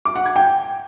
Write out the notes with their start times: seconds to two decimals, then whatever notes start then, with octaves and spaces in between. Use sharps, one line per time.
0.05 D6
0.16 F#5
0.26 G#6
0.36 G5